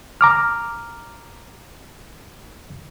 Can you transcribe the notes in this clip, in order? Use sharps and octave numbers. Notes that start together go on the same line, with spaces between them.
A#5 D6 F6